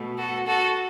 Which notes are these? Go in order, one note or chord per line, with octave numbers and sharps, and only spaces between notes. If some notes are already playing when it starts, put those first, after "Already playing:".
Already playing: B2 A3
F#4 A4
F#4 A4